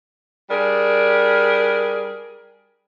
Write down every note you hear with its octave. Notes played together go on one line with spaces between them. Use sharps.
G3 D4 G#4 A#4